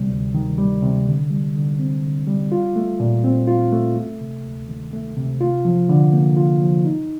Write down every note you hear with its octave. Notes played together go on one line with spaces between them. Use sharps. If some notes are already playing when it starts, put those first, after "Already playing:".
Already playing: C3 G3
D2
D#3
G3
C3
D3
G3
D3
C4
D3
G3
F4
A3
A#2
C4
F4
A3
A3
C3
D2
D#3
A3
C3
F4
F3
D3
A#3
F4
F3
D#4